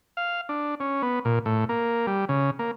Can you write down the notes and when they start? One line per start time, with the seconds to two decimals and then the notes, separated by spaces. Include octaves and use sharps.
0.17 F5
0.49 D4
0.80 C#4
1.02 B3
1.25 A#2
1.46 A2
1.69 A#3
2.07 G3
2.29 C#3
2.59 A#3